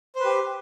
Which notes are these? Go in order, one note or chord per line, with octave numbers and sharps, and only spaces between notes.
G4 B4 C5